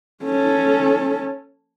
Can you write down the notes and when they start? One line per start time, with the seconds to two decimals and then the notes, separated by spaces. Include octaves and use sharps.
0.24 C#4 A4